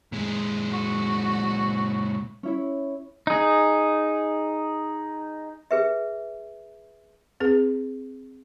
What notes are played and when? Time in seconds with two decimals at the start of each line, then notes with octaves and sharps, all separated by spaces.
0.12 A#2 G#3
0.72 F#4
2.43 C#4 E4 C#5
3.27 D#4 G#4
5.71 G#4 B4 E5
7.40 C4 G#4 B4